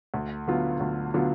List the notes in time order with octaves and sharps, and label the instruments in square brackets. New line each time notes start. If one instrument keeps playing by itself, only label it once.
[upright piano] D2
D3 F#3 B3 F4
D2
D3 F#3 B3 F4